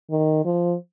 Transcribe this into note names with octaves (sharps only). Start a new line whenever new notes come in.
D#3
F3